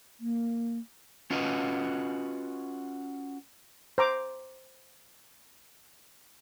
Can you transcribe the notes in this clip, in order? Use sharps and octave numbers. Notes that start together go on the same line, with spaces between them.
A#3
C#4 F4 F#4 B4 D#5
C5 A#5 D6